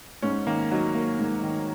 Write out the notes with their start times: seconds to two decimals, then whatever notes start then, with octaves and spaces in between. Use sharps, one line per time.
0.22 G#2 C#4
0.46 D#3 A#3
0.71 F#3 D#4
0.94 A#3
1.19 G#2
1.43 D#3